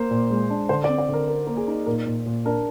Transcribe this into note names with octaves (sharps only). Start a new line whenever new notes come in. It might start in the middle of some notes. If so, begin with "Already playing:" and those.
Already playing: A#3 C5
A#2
G#3
D4
D3 C5
D5
C4
D5
D3
A#4
A#4
A#3
G#4
D#4
A#2 A#4
A#2
A#2
D4 A#4